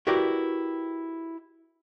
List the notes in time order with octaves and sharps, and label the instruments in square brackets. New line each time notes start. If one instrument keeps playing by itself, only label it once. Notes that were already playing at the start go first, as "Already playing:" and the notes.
[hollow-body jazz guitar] E4 F#4 G4 A#4 B4 D5